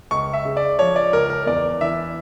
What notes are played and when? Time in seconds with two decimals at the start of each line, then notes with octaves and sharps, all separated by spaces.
0.11 C#2 C#6
0.33 E5
0.45 C#3
0.57 D5
0.79 F3 C#5
0.96 D5
1.12 C#2 A#4
1.30 A#4
1.46 E2 D5
1.81 E3 E5